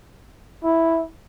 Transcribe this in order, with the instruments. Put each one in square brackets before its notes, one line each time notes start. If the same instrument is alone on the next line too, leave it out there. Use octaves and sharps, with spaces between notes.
[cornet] E4